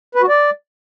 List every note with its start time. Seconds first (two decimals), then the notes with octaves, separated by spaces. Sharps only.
0.15 B4
0.22 F#4
0.29 D5